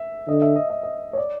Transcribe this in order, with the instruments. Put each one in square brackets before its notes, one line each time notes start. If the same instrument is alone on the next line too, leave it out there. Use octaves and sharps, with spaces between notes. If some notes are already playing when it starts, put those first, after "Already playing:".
Already playing: [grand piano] E5
[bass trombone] D3 [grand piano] D#5
[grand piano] E5
D#5
E5
D#5
C#5
D5